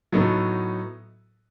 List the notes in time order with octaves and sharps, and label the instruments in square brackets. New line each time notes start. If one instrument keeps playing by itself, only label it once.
[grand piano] A2 F#3 B3 D#4 A4